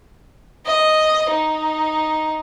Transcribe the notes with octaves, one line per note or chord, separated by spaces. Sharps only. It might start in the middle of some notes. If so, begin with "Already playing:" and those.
D#5
D#4